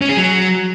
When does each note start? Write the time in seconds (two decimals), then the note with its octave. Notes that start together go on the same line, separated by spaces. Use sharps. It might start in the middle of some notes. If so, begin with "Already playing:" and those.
0.02 C#4
0.09 G#4
0.17 F#3